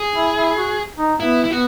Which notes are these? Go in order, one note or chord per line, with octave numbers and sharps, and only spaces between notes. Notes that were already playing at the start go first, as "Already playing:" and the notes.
Already playing: G#4
E4
E4
F#4
D#4
B3 E4
E4
B3 F#4